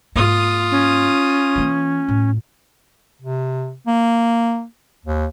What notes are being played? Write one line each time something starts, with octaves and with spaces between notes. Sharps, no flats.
G#2 A#3 F4 D#6
C#4
E3 A#3
A2
C3
A#3
D#2